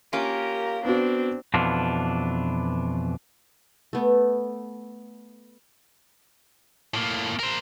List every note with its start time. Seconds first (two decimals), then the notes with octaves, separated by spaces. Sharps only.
0.13 A#3 C#4 F4 G4 A#4
0.85 B3 C4 D4 F#4
1.54 F2 B2 E3 D4 F4
3.93 A3 B3
6.94 A2 A#3
7.39 A#4 C5